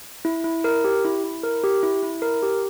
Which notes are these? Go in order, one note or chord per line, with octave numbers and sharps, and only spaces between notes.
E4
E4
A#4
G4
E4
E4
A#4
G4
E4
E4
A#4
G4